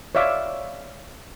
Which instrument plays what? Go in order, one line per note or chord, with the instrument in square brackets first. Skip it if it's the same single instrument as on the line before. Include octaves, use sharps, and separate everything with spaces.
[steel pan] C#5 D5 E5 F5 D6